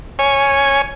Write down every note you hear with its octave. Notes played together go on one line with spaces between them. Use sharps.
C#5 G#5